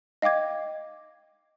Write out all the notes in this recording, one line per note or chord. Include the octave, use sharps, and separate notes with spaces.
D#5 F5 G5 D6 G#6